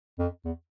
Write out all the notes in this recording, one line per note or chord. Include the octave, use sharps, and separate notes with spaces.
F2
E2